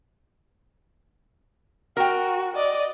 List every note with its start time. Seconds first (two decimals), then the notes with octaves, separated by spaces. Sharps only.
1.97 F#4 A#4 G5
2.55 D5 D#5